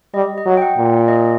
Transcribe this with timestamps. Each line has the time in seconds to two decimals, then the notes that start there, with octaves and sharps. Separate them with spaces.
0.14 G3 D#5
0.38 D#5
0.46 F#3
0.57 G5
0.62 F#5
0.77 A#2
1.08 D#5